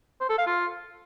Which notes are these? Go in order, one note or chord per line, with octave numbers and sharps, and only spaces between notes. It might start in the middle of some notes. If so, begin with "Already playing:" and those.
C5
A4
F5
F4